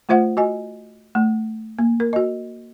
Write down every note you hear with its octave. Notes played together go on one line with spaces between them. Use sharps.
A3 F4 C5 E5 F#5
F#4 D#5 G#5
A3
A#3
A#4
F#4 D#5